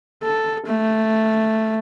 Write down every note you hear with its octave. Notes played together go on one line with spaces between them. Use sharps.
A4
A3